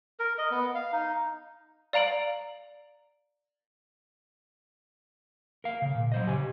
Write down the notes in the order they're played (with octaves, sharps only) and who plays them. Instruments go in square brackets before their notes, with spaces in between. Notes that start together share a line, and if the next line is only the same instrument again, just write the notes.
[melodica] A#4
D#5
B3
F5
D#4
[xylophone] D5 F5 A#5 D7 F#7
[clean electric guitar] A#4 F5
C#3
A#2
F#3 C5 D#5
C#3 G4 G#5